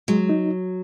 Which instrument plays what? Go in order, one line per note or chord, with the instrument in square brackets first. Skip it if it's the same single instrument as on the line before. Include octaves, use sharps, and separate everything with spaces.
[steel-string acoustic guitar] F#3 [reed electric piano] G#3
[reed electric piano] D#4